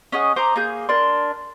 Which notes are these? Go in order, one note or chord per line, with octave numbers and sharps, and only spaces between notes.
C#4 G#4 D#5 F#5
C5 A#5 D6 D#6
A#3 G#4 G6
D4 A#4 C6